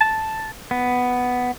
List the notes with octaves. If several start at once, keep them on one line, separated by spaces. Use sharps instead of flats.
A5
B3